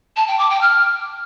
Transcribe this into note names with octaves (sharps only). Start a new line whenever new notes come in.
A5
G5
D6
G5
F6